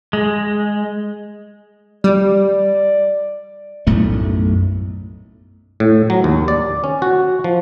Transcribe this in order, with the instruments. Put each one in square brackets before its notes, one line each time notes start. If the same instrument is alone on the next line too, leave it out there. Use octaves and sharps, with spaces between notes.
[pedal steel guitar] G#3
[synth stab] G3 [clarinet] D5
[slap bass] B1 F#2 A2 A3
[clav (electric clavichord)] A2
F#3
D#2
D5
C#4
F#4
F3